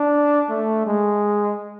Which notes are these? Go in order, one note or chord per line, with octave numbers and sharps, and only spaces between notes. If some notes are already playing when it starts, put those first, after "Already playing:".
Already playing: D4
A3
G#3